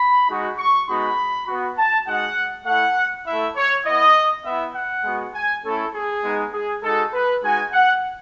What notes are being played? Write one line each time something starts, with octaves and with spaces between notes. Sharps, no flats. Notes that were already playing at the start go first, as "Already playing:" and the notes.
Already playing: B5
G#3 D#4 F#4
C#6
G#3 B3 D#4 F#4 B5
B3 F#4
A5
G#3 D#4 F#4 F#5
A3 E4 F#5
A3 E4 E5
C#5
B3 E4 D#5
B3 E4 E5
F#5
G#3 B3 F#4
G#5
A3 C#4 E4 A4
G#4
G#3 B3 D#4
G#4
G#3 D#4 F#4 A4
B4
G#3 D#4 F#4 G#5
F#5